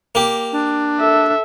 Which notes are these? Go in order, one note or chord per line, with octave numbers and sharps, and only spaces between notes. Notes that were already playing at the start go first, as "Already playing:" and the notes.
A#3 G4
D4
A4 E5